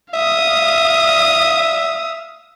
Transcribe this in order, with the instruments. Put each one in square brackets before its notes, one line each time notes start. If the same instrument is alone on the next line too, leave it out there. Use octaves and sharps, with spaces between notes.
[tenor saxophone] E5 [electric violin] F5 D#6